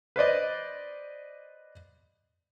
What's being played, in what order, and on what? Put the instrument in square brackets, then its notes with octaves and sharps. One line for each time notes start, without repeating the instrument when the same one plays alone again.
[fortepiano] B4 C5 D5 D#5